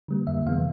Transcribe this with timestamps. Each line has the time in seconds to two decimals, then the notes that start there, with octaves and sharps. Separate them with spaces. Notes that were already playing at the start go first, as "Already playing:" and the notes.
0.08 D3 G3 A#3
0.27 F2 E5
0.46 C3 E3 G#3 B3 F5